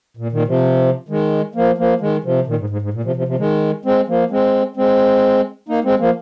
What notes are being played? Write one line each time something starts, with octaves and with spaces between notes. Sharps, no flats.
A#2
A#2 D#3
C3 F3
D#3 G#3
F3 A#3
F3 A#3
D#3 G#3
C3 F3
A#2 D#3
G#2
G#2
G#2
A#2
C3 F3
C3 F3
C3 F3
D#3 G#3
G#3 C4
F3 A#3
G#3 C4
G#3 C4
A#3 D#4
G#3 C4
F3 A#3